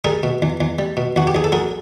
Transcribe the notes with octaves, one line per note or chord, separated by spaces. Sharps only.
G3 G#4 A#4
B2
E2
E2
G3
B2
E2 F#4
G4
E2 G#4
A4
F#3 G#4 A#4